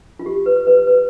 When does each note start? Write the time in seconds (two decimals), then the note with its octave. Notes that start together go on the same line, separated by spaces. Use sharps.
0.19 F4
0.26 G4
0.46 B4
0.67 B4
0.87 B4